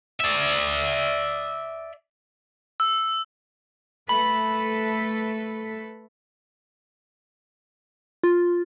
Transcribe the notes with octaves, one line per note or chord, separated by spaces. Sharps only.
D5 E5
E6
A3 A4 B4 B5
F4